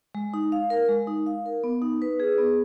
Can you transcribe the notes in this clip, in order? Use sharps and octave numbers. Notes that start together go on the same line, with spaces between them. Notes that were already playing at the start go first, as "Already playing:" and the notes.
G#3
D#4
F5
A#4
G#3
D#4
F5
A#4
B3
D#4
B4
G#4
B3